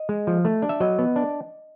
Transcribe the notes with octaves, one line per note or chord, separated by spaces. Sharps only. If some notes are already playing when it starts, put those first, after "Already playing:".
Already playing: D#5
G#3
F3
A3
D4
E5
F#3 D#5
B3
D4